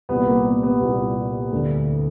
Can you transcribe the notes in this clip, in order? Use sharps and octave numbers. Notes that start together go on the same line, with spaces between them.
C2 A#2 B3
A#3
B3
B3
C2 A#2
D2 D3